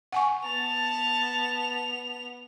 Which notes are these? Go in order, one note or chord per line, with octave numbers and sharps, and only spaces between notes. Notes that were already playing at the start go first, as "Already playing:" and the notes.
F#5 G#5 C#6
B3 A5 F7